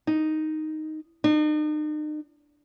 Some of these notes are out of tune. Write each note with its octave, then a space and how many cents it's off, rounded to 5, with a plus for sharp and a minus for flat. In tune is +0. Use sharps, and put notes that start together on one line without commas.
D#4 +0
D#4 -40